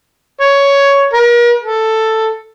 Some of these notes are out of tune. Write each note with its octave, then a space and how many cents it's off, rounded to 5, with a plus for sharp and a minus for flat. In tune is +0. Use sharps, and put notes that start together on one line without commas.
C#5 +10
A#4 +40
A4 +5